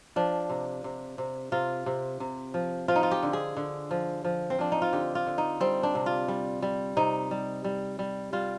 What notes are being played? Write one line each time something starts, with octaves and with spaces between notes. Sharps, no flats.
F3 D4
C3
C3
C3
C3 F4
C3
C3
F3
F3 F4
D#4
F4
G4
D3
G#4
D3
F3
F3
C4
F3 D4
D#4
F4
D3 G4
F4
D3
D#4
G3 C4
D4
C3
F4
G3
G3
C3 D#4
G3
G3
G3
G3 F4